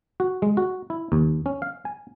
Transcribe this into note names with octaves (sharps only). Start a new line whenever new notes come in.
F#4
G#3
F#4
E4
D#2
C#4
F5
G#5